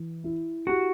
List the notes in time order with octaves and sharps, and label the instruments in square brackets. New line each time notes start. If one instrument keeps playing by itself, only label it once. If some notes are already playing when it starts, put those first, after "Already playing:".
Already playing: [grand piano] E3
E4
[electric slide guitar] F#4 [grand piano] G4